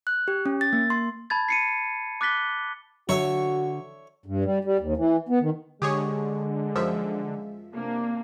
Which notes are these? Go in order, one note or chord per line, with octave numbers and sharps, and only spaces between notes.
F#6
G4
C#4
A6
A#3
C6
A5 B5 G#6 A6
C7 C#7 D#7
D6 F#6 A6 B6 G7
D3 F#3 F#4 C#5 E5
G2
G3
G3
D#2
E3
B3
D#3
D3 G#3 G4 G#4 C#5
F#2 F3 E5
C3 A#3 D4